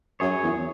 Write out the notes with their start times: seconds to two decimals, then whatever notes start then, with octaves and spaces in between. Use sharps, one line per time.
0.20 F#2 G#4 C#5
0.43 E2